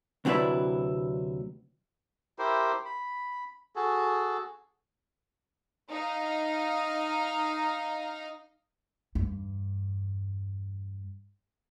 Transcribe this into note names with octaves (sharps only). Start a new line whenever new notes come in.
D2 C3 F#3 D4 E4 B4
E4 G4 A#4 C5
B5
F#4 G#4 A4
D#4 F5
E2 G2